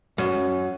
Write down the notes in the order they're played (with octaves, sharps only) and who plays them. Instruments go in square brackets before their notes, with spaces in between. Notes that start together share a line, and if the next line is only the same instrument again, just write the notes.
[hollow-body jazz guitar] F#2